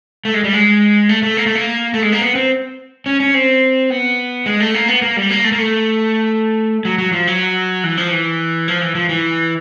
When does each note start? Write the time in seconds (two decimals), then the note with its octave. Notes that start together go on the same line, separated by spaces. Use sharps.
0.25 A3
0.34 G#3
0.44 G3
0.53 G#3
1.09 A3
1.23 A3
1.37 A#3
1.46 A3
1.55 A#3
1.94 A3
2.02 G#3
2.12 A#3
2.21 B3
2.35 C4
3.06 C#4
3.20 C#4
3.34 C4
3.90 B3
4.46 G#3
4.60 A3
4.74 A#3
4.88 B3
5.02 A#3
5.17 G3
5.30 A#3
5.44 A3
5.52 A#3
5.58 A3
6.85 F#3
6.98 F#3
7.13 F3
7.27 F#3
7.84 E3
7.97 F3
8.11 E3
8.68 F3
8.81 E3
8.95 F3
9.09 E3